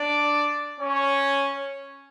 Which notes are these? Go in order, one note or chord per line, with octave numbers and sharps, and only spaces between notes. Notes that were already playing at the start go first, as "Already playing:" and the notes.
Already playing: D4 D5
C#4 C#5